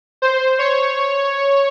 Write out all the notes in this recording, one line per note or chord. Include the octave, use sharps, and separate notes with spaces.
C5
C#5